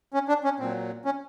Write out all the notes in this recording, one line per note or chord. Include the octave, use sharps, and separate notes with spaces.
C#4
D4
C#4
A#2 F#3 C4
C#4